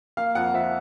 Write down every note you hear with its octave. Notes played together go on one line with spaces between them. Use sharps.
A#3 F5
F2 F#5
F3 E5